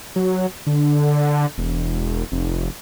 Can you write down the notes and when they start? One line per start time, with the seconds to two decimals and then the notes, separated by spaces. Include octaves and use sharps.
0.16 F#3
0.66 D3
1.58 E1
2.32 F1